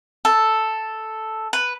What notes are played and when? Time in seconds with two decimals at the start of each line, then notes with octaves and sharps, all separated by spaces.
0.25 A4
1.53 B4